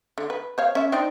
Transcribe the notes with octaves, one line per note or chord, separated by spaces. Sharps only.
D3
B4
C5 C#5 F5
C#4 E5
C4 D4 D#4